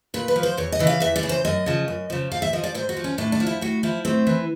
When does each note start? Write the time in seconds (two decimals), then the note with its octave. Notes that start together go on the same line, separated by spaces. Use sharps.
0.14 A#2 B4
0.28 B4
0.36 F3
0.43 C5
0.57 E2 C#5
0.72 D#5
0.79 C#3 E3
0.87 F5
1.00 E2 E5
1.16 D5
1.23 C#3 E3
1.29 C5
1.45 F#2 D#5
1.66 C#3 F3
1.88 F#2
2.10 C#3 F3
2.31 G#2 F5
2.42 E5
2.53 F3 D#5
2.64 D5
2.74 G#2 C5
2.89 F#4
2.97 F3
3.04 C#4
3.18 A2 D4
3.32 D4
3.40 F3
3.47 E4
3.61 A2 F#4
3.83 F3 E4
4.05 A2 C4
4.27 E3